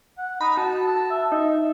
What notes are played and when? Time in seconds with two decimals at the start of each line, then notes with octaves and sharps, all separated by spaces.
0.18 F#5
0.41 D#4 B5
0.57 F#4 A5
0.87 A5
1.10 E5
1.32 D#4 E5